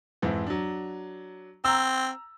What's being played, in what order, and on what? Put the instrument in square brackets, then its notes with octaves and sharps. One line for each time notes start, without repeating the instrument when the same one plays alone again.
[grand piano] F2 G#2 E3
F#3 D4
[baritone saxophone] C4 [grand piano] A#5 E6